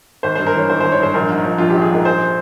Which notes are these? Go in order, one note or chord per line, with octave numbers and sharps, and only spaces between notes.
G#1 C5
G2 C5
A#4
E3 C#5
G#1 C5
G#1 C5
C#5
G2 C5
A#1 A#4
G#2
F3
A#1 F4
A#1 G4
G#4
G#2 A#4
A#1 C5